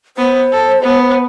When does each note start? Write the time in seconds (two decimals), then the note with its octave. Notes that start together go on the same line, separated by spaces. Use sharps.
0.17 B3 C5
0.52 A4
0.82 B3